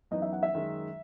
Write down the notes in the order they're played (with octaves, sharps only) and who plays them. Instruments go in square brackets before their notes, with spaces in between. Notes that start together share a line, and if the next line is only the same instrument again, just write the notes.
[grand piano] F#2 E3 B3 D#4 [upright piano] D#5
[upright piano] E5
F#5
E5
[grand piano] F#2 D#3 G#3